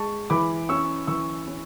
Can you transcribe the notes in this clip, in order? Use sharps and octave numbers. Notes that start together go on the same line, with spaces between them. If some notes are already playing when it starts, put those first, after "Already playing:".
Already playing: G#3 A5 C#6
E3 B5 D6
C#4 C#6 E6
E3 C#6 E6
C#4